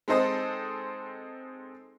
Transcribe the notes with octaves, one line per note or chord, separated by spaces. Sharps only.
G#3 C4 D#4 A4 C5 D#5